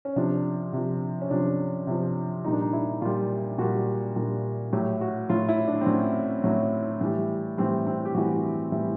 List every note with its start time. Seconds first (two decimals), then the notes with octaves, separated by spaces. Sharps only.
0.05 C#4
0.16 C3 F3 D4
0.73 C3 F3
1.21 C#4
1.30 C3 F3 D4
1.87 C3 F3
2.45 A#2 G3 D#4
2.53 D4
2.61 D#4
2.73 E4
3.01 A#2 G3 F4
3.58 A#2 G3 F#4
4.16 A#2 G3
4.73 A2 F#3 G4
5.01 F#4
5.29 A2 F#3 F4
5.49 E4
5.68 D4
5.81 C4
5.86 A2 F#3 C#4
6.44 A2 F#3
7.01 A2 E3 G3
7.58 A2 E3 G3 C4
7.87 C4
8.05 G4
8.14 A2 E3 G3 F#4
8.72 A2 E3 G3